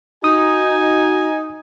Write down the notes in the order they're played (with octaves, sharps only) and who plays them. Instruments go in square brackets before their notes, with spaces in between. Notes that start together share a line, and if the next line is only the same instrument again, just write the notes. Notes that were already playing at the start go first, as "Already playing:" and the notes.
[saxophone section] D#4 [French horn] F#4 [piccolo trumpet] G#5 [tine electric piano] D#6